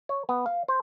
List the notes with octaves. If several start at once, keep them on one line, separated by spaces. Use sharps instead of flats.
C#5
B3
F5
C5